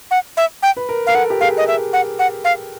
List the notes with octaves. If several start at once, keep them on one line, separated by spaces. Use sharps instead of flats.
F#5
E5
G5
B4
A#4
A#4 F5
A4 F#5
G4
G#4 F5
D#5
E5
F#5
F#5
F5